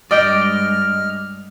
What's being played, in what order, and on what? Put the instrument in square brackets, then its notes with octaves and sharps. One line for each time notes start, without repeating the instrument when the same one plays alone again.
[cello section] G2 G#3 [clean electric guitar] D5 G5 [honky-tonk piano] D#5 [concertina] F6